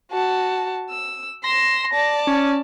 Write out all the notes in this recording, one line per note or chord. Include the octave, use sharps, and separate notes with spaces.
F#4 A5
E6
C6 A#6 E7
D5 A5
C#4